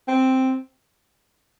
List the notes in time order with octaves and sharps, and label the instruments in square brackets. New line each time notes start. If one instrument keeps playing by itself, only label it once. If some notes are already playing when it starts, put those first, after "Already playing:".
[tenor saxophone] C4